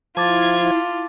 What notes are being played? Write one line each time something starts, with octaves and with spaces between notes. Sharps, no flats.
F3 E4 F4 A5 D6 G#6 A6